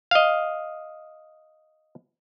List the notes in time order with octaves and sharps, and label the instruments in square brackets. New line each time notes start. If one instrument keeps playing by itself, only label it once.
[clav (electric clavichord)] D#5 F5